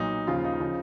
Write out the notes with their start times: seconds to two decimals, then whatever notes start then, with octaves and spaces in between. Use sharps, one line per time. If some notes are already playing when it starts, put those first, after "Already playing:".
Already playing: B1 A#2 F#3 D#4
0.27 D#2 C#3 F3 F4
0.45 D#4
0.61 C#3 F3